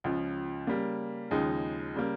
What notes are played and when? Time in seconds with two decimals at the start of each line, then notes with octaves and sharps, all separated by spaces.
0.04 C#2 C#3 F3
0.67 C#3 G3 A#3
1.31 D#2 C#3 F3 G#3 D#4
1.95 C#3 G3 A#3